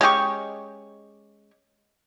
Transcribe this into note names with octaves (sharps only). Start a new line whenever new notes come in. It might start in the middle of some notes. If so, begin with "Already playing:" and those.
G#3 C#4 G4 C#6